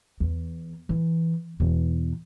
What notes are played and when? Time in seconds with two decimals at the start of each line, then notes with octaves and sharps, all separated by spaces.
0.20 E2
0.89 E3
1.60 E2 B2